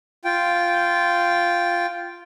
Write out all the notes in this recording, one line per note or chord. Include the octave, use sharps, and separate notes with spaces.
F4 G5